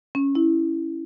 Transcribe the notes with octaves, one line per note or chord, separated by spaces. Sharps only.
C#4
E4